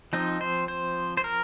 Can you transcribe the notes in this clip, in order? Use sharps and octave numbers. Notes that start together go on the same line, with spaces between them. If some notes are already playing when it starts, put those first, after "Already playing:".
F3 C4 D#4
C5
C5
C5
A#4